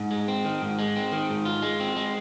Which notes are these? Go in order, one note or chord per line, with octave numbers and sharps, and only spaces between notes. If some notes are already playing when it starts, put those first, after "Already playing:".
Already playing: G#2
G#3
C4
D#3
G#2
G#3
C4
D#3
G#2
F4
G#3
C4
G#3